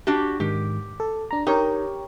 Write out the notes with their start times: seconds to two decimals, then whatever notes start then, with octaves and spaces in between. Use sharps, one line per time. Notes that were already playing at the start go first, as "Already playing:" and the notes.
0.07 D4 F#4 G4
0.40 G#2 D#3 G4
1.00 A4
1.31 D4 A#5
1.47 D#4 G4 A#4 C#5